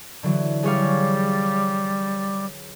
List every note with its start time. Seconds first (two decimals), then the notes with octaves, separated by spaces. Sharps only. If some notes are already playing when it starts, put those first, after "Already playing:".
0.23 D3 E3 F#3
0.64 G3 G#4 C#5 F5